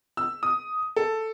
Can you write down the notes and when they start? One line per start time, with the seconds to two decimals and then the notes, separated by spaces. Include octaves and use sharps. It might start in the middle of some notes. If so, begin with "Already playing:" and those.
0.17 E6
0.43 D#6
0.96 A4